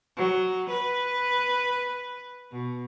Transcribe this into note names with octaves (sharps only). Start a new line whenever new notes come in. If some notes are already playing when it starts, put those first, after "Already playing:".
F#3
B4
B2